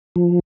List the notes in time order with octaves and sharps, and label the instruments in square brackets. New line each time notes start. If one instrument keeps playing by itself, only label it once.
[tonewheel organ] F3